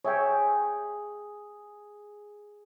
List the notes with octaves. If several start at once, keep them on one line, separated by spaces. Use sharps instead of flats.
G#4 C#5 E5 G5